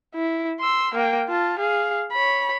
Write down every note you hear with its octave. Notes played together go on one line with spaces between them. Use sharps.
E4
C6 E6
A#3 G5
F4 A5
G#4 F5
C#5 B5